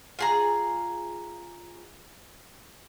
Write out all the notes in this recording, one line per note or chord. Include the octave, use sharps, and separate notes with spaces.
F4 G#4 A#5